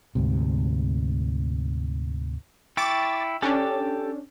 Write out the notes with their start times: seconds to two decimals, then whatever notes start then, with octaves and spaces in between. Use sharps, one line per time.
0.15 D2 G#2 C3
2.77 E4 G5 C#6 D6 A6
3.42 C#4 D4 G4 A4 D6